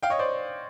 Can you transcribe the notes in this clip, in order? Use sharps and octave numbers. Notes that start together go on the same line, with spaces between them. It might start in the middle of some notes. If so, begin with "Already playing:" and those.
F5 G5
C#5 D#5
C5 D5